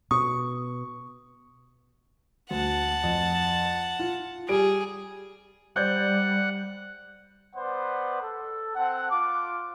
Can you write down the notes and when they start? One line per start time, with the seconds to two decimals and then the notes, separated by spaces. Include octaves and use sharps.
0.11 B2 C#6 D#6
2.50 D2 F#5 A5
3.03 F2
3.99 F4
4.49 G3 G#4 D7
5.76 G3 C5 D5 F#5 G6
7.55 B3 B4 C5 D5 F#5
8.22 A4
8.75 C4 A4 F#5
9.11 F4 D6